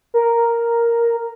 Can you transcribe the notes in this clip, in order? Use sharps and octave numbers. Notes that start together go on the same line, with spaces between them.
A#4